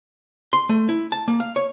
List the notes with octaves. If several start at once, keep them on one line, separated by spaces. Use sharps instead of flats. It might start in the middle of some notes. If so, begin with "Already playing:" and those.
C6
A3
E4
A5
A#3
F5
C#5